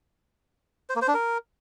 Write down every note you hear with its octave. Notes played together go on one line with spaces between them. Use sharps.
C5
A#3
C5
D4
A#4